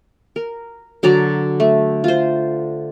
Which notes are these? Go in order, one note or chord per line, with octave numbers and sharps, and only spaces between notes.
A#4
D3 F#3 D5 A#5
A3
F4 C5